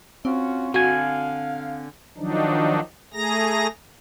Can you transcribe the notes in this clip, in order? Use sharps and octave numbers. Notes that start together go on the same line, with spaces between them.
C4 C#4 F4 F#4
D3 F#4 F5 G#5
D#3 F3 F#3 D4 D#4
A3 G#4 A#5 A#6